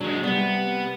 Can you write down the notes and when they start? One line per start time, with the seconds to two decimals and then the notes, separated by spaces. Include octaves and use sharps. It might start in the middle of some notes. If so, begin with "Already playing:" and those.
0.01 F#3 G#3 D4
0.23 C3 G3 B3